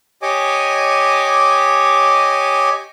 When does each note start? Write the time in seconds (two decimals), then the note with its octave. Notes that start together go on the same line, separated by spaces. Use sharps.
0.22 G4 C#5 D#5 G#5 D6